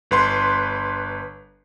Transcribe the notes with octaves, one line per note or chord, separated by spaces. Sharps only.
G1 B4 C6